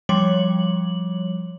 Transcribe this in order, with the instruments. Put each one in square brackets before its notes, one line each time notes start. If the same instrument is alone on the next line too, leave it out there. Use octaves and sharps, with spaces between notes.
[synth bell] F3 G3 C#5 F#7